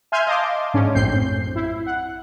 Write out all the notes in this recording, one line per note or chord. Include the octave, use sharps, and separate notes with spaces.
E5 G#5 C6 F6 G6 G#6
D#5 F5 A5 C6 D6
G#2 C#4 D4
A#1 F#2 A2 C4 G6 C7
E4
F#5